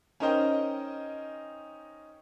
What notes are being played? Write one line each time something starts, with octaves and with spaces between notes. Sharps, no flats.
C#4 D#4 A#4 C5 D#5 G5